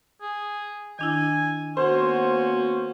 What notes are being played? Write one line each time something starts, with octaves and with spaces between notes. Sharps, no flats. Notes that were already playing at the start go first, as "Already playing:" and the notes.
G#4
D#3 D4 E4 G#5
A#3 B3 C#4 F#4 C5